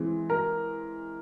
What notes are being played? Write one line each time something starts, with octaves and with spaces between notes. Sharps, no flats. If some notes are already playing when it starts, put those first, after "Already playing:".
Already playing: E3 G#3 C4
A#4